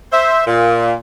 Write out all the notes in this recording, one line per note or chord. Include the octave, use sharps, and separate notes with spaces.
C5 E5
A#2